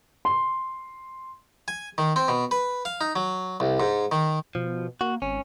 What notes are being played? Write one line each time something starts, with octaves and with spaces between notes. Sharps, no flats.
C6
G#5
D#3
C4
B2
B4
F5
D#4
F#3
C2
G#2
D#3
B2 F3
A#3 F#4
G#1 C#4